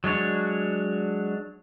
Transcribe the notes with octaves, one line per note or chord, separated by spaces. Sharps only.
F#3 G#3 D4 C#5